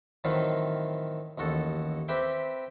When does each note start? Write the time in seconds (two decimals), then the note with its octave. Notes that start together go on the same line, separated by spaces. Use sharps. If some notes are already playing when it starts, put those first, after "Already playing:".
0.24 A2 D#3 E3 F#3 C4 F5
1.38 A1 D#2 F#4 A4
2.08 C4 G4 B4 E5 G5